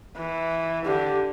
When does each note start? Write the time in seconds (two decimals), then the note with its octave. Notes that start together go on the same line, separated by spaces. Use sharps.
0.16 E3
0.85 D3 G4